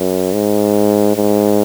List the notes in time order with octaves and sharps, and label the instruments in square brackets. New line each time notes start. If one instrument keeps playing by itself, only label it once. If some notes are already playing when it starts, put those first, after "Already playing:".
Already playing: [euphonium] F#2
G#2
G#2